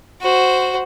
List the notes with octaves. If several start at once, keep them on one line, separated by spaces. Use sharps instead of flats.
F#4 C5